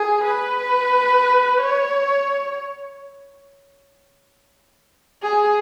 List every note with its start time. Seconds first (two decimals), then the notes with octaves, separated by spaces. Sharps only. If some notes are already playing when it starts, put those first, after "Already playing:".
Already playing: G#4
0.24 B4
1.60 C#5
5.23 G#4